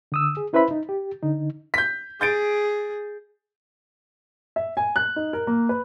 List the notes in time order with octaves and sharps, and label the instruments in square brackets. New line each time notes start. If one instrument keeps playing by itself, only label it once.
[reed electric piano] D3 D#6 E6
G#4
C#4 E4 B4 C5 E5 B5
D#4
G4
D3 D#4
[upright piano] G6 B6
[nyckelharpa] G#4 [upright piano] G6 A6 D7
[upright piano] E5
G#5
F#6
D#4
A#4
A#3
B4